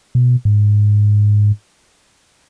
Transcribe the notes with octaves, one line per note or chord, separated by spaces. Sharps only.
B2
G#2